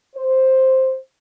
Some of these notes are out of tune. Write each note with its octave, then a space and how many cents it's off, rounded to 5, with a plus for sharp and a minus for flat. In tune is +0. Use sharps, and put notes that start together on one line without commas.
C5 +5